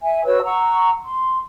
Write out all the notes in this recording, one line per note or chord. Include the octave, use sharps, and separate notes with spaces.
E5 G#5
F#4 B4 C#5 E6
F#5 A#5 C#6 E6
C6